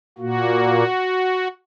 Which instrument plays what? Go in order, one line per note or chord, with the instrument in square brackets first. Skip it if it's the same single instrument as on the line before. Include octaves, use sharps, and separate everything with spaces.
[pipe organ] A#2 A#3 F#4